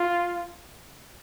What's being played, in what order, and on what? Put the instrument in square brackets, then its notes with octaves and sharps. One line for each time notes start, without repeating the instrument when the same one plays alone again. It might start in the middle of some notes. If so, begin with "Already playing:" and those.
Already playing: [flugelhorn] F4